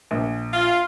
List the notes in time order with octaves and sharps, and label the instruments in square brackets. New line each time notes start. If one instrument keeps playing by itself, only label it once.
[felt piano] A#1
[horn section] F4